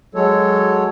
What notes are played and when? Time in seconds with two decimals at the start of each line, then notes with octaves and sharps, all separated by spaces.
0.15 F#3 G#3 A4 C#5